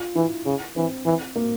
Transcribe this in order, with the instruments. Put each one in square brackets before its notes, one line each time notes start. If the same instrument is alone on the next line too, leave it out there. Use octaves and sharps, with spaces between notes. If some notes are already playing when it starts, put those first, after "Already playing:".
Already playing: [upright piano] F4
[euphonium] E3 [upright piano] E4
[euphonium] C#3
[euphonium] E3 [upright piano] C4
[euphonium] E3
[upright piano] A#3